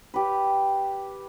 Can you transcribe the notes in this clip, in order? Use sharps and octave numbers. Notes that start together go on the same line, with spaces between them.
G4 B4